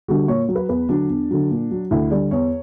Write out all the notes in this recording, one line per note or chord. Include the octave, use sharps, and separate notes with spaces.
D3 G3 F#4
A#2 C#5
F#3
B4
E2 B4
D3 F#3 D4
E2
D3 F#3
A#2
F#3
D2 E4
D3 G3 D5
E2 C#5